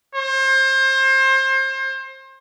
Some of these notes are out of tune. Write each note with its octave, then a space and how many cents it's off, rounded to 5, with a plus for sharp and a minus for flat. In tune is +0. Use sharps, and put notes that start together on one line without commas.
C5 +30